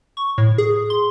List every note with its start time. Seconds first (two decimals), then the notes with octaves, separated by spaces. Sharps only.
0.17 C#6
0.38 A2
0.58 G#4
0.90 C6